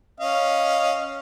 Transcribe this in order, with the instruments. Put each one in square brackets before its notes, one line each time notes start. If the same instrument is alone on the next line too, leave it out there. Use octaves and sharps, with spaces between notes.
[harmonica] C#4 D#5 F5